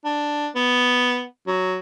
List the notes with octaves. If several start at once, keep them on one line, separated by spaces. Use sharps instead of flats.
D4
B3
F#3